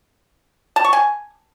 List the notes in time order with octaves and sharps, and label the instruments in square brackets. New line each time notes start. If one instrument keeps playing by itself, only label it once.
[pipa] A5
C#6
G#5